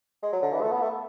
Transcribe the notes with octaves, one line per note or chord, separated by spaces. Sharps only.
G#3
F#3
D3
E3
A3
B3
A3